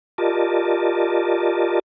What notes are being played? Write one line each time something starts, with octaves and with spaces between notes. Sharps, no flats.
F4 G4 A#4 D5 D#5 A5